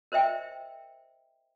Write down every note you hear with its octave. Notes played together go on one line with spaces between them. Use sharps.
A#4 C5 D#5 E5 G5